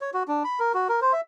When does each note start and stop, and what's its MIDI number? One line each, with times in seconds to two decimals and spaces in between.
0.01 0.10 73
0.14 0.23 66
0.28 0.43 62
0.44 0.59 83
0.60 0.72 70
0.74 0.88 66
0.89 1.00 70
1.01 1.13 72
1.13 1.21 76